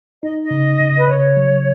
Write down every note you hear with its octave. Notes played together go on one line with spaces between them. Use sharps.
D#4 D#5
D#5
C#3
C#3
B4
C#3 C#5
F#3